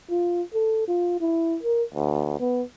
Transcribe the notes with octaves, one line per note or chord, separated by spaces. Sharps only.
F4
A4
F4
E4
A#4
D2
B3